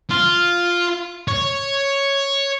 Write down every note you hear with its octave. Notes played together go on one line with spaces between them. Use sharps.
F4
C#5